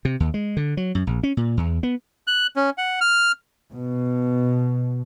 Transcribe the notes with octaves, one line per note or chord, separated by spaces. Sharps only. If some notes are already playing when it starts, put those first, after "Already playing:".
C3
D#2
G#3
D3
F#3
F#2
A#1
C#4
A#2
E2
B3
F#6
C#4
F#5
F6
B2